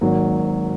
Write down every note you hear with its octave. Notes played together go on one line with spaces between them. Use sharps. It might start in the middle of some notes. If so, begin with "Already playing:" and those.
G#1 G#2 F#3 A#3